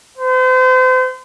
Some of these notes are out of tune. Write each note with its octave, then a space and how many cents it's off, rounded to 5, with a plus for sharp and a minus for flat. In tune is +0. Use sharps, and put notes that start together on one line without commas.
C5 -40